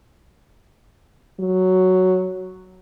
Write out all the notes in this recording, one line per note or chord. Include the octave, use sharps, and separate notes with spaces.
F#3